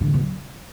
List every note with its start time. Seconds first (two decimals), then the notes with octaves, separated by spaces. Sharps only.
0.01 D3
0.07 A#2
0.14 B2
0.20 F#3